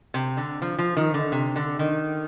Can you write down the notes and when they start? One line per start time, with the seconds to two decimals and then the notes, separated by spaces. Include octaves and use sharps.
0.14 C3
0.37 D3
0.62 F3
0.79 F3
0.97 D#3
1.14 D3
1.32 C3
1.56 D3
1.79 D#3